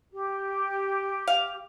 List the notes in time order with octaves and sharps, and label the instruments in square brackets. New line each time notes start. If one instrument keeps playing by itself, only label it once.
[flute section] G4
[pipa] F5